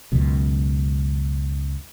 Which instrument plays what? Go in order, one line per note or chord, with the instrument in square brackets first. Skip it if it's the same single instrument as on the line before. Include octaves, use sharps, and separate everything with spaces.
[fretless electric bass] C#2 F#2 B2